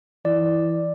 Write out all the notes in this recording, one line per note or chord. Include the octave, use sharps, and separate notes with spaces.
E3 D5